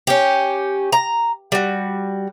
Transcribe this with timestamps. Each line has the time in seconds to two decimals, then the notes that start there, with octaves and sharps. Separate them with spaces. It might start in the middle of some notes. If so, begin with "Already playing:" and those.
0.07 C#4 G4
0.92 A#5
1.52 G3 F#4